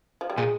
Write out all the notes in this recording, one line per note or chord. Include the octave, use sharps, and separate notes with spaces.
F3
G3
A#2 G#3